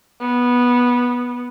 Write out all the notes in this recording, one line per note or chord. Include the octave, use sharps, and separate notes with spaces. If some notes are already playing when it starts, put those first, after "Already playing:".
B3